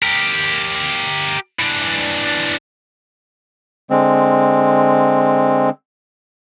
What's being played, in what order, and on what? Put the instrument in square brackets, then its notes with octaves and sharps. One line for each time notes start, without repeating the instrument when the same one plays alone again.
[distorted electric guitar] G4 A#4
E3 D4
[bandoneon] D3 G#3 C4